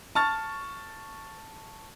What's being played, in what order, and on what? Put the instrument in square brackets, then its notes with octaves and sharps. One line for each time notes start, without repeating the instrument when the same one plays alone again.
[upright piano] A5 C#6 F6 A6